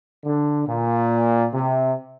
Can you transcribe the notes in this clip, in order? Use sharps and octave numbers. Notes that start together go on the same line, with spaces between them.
D3
A#2
C3